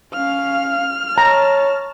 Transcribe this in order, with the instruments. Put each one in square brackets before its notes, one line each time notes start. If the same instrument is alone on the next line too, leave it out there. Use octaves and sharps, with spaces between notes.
[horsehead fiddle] C#4 F5 [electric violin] F6
[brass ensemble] C#5 [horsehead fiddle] A5 [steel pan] A#5